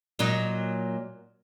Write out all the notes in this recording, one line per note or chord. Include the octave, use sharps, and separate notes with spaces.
A#2 F#3 D#4